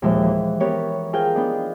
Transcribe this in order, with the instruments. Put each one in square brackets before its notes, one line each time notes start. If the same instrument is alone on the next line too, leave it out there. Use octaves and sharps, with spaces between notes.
[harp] D#2 A#2 F3 G#3 C5 E5
E3
B3 G4 A#4 B4 C#5
F4 G#4 A#4 C5 F5 G5
B3 D4 D#4